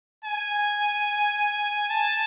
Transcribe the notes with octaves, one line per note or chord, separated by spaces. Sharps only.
G#5
A5